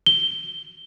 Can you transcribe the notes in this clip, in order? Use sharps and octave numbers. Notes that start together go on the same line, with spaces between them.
G7